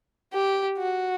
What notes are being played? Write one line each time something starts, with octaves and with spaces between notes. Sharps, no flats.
G4
F#4